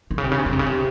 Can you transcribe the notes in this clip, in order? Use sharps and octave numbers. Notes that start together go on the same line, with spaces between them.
C3
C#3
C3
C#3
C3
C#3
C3
C#3
C3